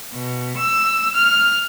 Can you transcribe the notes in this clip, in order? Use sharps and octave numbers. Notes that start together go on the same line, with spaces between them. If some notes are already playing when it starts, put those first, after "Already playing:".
B2
E6
F6